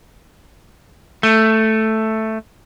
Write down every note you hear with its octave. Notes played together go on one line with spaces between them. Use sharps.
A3